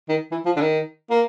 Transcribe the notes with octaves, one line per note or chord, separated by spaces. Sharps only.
D#3
E3
F3
D3
D#3
A#3